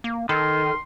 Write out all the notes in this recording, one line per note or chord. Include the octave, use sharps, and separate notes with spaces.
A#3
D#3 A4 C6